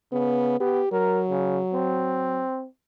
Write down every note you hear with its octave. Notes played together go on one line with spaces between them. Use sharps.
C#3 B3
B3 G4
F#3 A#4
C#3
C4